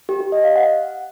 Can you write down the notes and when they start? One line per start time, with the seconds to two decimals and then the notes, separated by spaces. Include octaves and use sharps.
0.09 G4
0.21 G4
0.32 D#5
0.44 F5
0.56 F#5